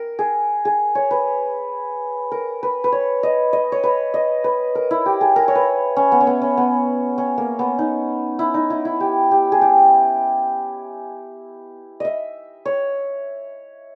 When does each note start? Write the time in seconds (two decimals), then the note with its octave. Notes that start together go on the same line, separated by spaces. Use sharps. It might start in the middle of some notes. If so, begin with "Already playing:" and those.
Already playing: A#4
0.19 G#4
0.65 G#4
0.95 C#5
1.11 B4
2.31 A#4
2.63 B4
2.84 B4
2.92 C#5
3.23 D#5
3.53 D#5
3.72 C#5
3.83 B4
4.14 D#5
4.44 B4
4.75 A#4
4.91 E4
5.06 G4
5.21 G#4
5.36 A#4
5.48 C#5
5.55 B4
5.97 C#4
6.12 B3
6.21 C#4
6.27 B3
6.42 C#4
6.57 B3
7.18 C#4
7.38 A#3
7.59 B3
7.79 D#4
8.39 E4
8.54 D#4
8.70 E4
8.85 E4
9.00 G4
9.31 G4
9.52 G#4
9.61 G4
12.00 D#5 E5
12.65 C#5